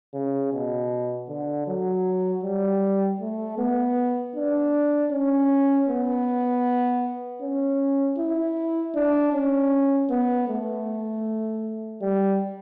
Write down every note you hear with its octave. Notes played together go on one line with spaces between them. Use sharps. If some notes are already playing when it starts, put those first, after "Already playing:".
C#3
B2
D3
F#3
G3
A3
B3
D4
C#4
B3
C#4
E4
D4
C#4
B3
A3
G3